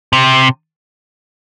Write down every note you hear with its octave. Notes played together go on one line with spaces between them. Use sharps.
C3